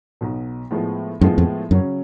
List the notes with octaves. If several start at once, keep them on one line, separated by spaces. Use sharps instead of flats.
B1 B2 F#3
A2 F3 G#3 B3
F#2 A2 F3 G#3 B3
F2
F#2 C#3 F#3 C#4